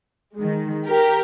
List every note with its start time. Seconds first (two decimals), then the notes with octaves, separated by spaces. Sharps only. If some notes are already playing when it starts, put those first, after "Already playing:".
0.35 D#3 G#3
0.87 G4 A#4